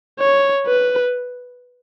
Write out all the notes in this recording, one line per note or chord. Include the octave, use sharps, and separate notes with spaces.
C#5
B4